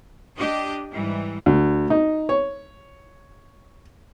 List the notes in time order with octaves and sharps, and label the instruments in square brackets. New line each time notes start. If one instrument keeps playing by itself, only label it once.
[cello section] D4 G4 D#5
G#2 E3 G3
[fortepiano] D2
D#4
C#5